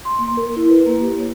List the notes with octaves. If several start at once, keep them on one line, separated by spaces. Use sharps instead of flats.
C6
A#3
A#4
E4
B4
A#3
G4
C#5